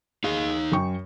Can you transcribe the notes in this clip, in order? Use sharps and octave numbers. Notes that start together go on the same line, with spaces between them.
D#4 G#4 F5
F#2 G5 C#6